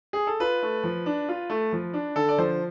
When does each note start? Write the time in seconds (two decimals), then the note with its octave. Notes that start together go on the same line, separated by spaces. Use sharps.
0.13 G#4
0.27 A4
0.40 F4 B4
0.62 A3
0.84 F3
1.06 D4
1.29 F4
1.50 A3
1.72 F3
1.94 D4
2.16 D3 A4
2.29 D5
2.38 F3 C5